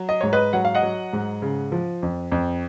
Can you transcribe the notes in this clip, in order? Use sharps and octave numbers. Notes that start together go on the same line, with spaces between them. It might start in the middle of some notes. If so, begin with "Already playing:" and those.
Already playing: F#3
D#5
G#2 C#5
B4 D#5
F#3 F#5
F5
D#5 F#5
F#3
G#2
C#3
F3
F2
F2